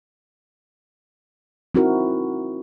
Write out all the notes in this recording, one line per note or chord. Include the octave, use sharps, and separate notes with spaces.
C4 D#4 E4 F#4 A#4